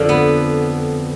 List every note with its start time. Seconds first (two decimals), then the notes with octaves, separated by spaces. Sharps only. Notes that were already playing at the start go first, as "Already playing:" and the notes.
Already playing: F2 D3 F3
0.09 B3